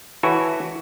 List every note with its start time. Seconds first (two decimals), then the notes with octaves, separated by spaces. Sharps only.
0.23 E3 E4 F#4 A4 C#5 G#5